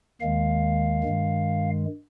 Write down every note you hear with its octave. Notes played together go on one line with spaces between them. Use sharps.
D#2 D#3 G#3 F5
G2 D#3 G#3